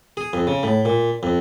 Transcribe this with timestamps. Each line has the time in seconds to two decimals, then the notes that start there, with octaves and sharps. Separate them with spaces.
0.17 G#4
0.33 F2
0.47 C#3
0.63 A2
0.85 A#2
1.23 F2